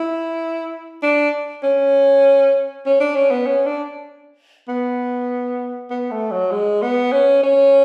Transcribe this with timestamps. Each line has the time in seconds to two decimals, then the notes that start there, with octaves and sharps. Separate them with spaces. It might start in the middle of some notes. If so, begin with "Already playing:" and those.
Already playing: E4
1.02 D4
1.63 C#4
2.86 C#4
3.00 D4
3.16 C#4
3.31 B3
3.46 C#4
3.66 D4
4.68 B3
5.90 B3
6.11 A3
6.31 F#3
6.51 G#3
6.82 B3
7.12 C#4
7.43 C#4